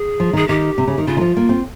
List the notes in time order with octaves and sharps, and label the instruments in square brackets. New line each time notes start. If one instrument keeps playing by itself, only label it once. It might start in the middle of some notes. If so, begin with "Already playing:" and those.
Already playing: [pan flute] G#4
[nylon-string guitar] F3
[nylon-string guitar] D#3 [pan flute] G#4
[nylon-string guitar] D#3 [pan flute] G4
[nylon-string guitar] C3
C#3
D#3
[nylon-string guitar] C#3 [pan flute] F4
[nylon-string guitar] D#3
F3
A#3
C4